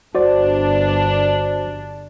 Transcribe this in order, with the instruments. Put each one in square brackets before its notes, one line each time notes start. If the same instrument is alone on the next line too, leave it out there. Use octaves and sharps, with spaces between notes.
[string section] G1 D4 [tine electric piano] F#4 C5 D5